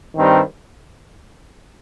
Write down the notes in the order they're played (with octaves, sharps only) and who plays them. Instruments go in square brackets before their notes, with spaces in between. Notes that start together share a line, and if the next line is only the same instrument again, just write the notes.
[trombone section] G2 D#3 G3 C4